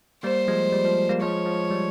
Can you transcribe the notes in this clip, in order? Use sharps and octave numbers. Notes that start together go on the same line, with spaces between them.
G3 A#3 C5
F3 G#3
G3
F3
G3 A#3
F3 G#3 C#5
F3
G3